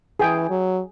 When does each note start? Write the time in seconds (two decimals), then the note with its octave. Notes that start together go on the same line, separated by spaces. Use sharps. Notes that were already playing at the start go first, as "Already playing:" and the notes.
0.20 E3 G#4 G5
0.50 F#3